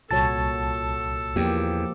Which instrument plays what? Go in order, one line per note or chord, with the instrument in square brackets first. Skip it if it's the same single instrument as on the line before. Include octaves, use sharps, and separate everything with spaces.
[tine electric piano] C2 A5 A6 [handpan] A#2 F#4 C#5 [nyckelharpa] A4
[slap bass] E2 [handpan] F3 A#3 G4